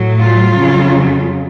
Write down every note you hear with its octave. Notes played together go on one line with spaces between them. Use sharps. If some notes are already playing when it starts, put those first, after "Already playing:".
Already playing: A2 F#3
F4
F2 C#3 F#3